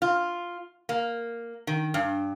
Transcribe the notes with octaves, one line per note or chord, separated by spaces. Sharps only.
F4
A#3
D#3
G2